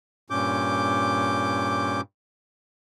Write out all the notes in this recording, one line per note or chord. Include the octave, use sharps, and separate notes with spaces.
G2 A#2 C#4 D6 G6